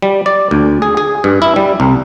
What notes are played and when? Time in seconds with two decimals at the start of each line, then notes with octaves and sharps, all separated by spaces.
0.02 G3
0.26 D5
0.51 D2
0.82 G#4
0.97 G#4
1.24 G2
1.42 E4
1.56 G3
1.80 C2